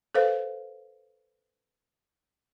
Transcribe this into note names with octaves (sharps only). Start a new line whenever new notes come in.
A4 B4 C5 F5